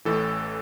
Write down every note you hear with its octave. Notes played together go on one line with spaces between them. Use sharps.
A1 A2 E3 A4